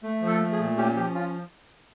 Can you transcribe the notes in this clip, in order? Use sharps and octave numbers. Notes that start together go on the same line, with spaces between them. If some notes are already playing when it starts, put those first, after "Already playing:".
A3
F3
A4
A3
G#4
A#2
C#4 G4
F3 G4
C#4 F4